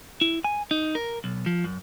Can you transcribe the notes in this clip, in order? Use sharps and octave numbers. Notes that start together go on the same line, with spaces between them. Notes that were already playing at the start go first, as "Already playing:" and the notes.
E4
G#5
D#4
A#4
B1
F3
F#2